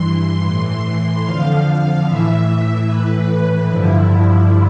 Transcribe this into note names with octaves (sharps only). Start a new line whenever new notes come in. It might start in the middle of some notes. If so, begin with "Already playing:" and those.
Already playing: G2 E3 C6
A2 E3
F2 D3 F3 F5
A2 E3 E5
A2 E3 B4
G2 D3 F3 E4